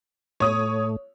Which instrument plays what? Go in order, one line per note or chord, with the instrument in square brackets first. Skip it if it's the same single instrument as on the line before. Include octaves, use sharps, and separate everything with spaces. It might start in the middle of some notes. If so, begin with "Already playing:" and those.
[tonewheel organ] A2 A3 [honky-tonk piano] C#5 D#6